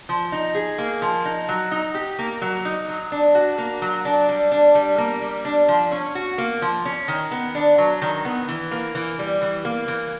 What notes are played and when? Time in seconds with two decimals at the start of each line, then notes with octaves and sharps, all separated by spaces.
0.09 F3
0.32 D#4
0.55 G#4
0.78 A#3
1.02 F3
1.25 D#4
1.49 F#3
1.71 D#4
1.94 G4
2.19 A#3
2.42 F#3
2.65 D#4
2.88 F#3
3.12 D4
3.35 F#4
3.58 A#3
3.82 F#3
4.05 D4
4.29 G3
4.52 D4
4.75 G3
4.98 A#3
5.22 G3
5.45 D4
5.68 F3
5.92 C#4
6.15 F#4
6.38 A#3
6.62 F3
6.85 C#4
7.08 D#3
7.31 B3
7.55 D4
7.78 F#3
8.02 D#3
8.25 B3
8.49 E3
8.71 A#3
8.95 E3
9.19 G3
9.42 E3
9.65 A#3
9.88 E3